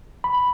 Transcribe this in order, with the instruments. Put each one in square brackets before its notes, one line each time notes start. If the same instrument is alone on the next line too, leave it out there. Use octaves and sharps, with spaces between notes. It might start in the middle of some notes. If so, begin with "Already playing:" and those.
[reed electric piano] B5